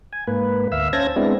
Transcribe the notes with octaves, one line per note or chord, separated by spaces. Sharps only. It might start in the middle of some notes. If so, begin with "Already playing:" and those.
G#5
G#2 A#3 B4
D2 E5 F5 E6
C#4 C5 A5 G#6 A#6
G#3 B3 C4 D4 E4